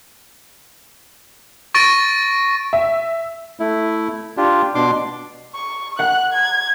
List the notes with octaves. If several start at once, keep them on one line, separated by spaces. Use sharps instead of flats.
C#6 A6 A#6 D7 D#7
E5
A3 E4
D4 F4 G4
B2 D4 C6 D6
C#6
F#5 F#6
G#6